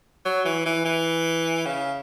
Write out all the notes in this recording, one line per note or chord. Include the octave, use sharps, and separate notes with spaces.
F#3
E3
E3
E3
C#3